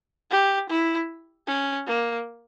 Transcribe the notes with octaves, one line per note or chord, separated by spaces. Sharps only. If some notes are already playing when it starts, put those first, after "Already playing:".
G4
E4
C#4
A#3